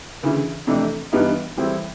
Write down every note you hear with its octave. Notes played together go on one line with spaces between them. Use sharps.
D2 C#3 E3
F2 C3 E3 A3 D4
G2 E3 G3 B3 D#4
A2 E3 G3 C4 E4